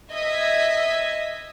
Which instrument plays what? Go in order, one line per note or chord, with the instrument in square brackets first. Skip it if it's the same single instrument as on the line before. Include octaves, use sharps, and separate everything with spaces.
[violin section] D#5 E5 G#6 B6